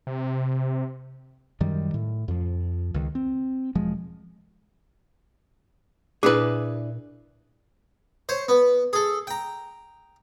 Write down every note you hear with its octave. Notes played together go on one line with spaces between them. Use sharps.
C3
F#2 D#3 G3
A2
F2 F3
C#2 D#3
C4
E1 F3 G#3
A#2 D4 E4 G#4 B4 G#5
C5 C#5
B3
G#4 A4
G5 A#5